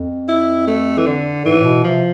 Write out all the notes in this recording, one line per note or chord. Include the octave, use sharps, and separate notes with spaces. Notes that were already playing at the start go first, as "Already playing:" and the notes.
Already playing: F2
E4
A3
E3
D3
G#2 E3
A2
B2
C3 F3